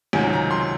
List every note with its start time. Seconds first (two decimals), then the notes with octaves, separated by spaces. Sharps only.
0.13 C#2 C3 D#3 F#3 G#5
0.33 A#5
0.51 C6